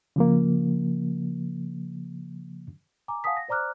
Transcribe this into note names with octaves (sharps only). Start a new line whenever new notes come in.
C#3 F3 A#3
G#5 A#5 D6
F5 F#5 G#5 A5 D#6 B6
A#6
C5 D5 A#5 D6 F6 F#6